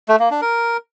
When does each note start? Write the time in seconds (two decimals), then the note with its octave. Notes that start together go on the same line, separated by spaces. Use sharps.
0.08 A3
0.20 A#3
0.31 D4
0.42 A#4